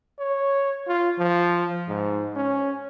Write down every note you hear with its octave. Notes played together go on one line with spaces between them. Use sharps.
C#5
F4
F3
G#2
C#4